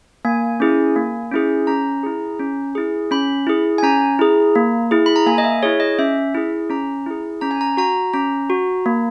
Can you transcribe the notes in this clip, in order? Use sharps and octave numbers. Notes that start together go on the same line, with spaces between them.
A#3 G#5
C#4 E4 G#4
A#3
C#4 E4 G#4
C#4 A#5
E4 G#4
C#4
E4 G#4
C#4 B5
E4 G#4
G#5
C#4 A#5
E4 G#4
A#3
E4 G#4
B5
A#5
A#3 G#5
D#5
E5
E4 G#4 C#5
D#5
C#4 E5
E4 G#4
C#4 A#5
E4 G#4
C#4 A#5
G#5
A#5
F#4 A#5
C#4 A#5
F#4
A#3